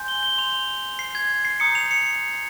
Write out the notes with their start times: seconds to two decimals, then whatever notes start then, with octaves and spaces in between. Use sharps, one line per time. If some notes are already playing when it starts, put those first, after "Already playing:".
Already playing: G#5 C6 G6
0.08 G7
0.23 G7
0.38 C6 G6 F7
0.99 C7
1.15 G#6
1.30 G#6
1.45 C7
1.60 A#5 D#6 G6 C#7
1.75 F7
1.91 C#7